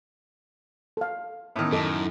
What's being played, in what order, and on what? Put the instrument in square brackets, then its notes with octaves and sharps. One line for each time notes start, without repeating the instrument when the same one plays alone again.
[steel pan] A4 F5
[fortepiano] A2 D#3 [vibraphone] B3 C#4 E6 [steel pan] E5
[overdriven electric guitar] F#2 [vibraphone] D#4 E4 [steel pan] A4 D#5 D6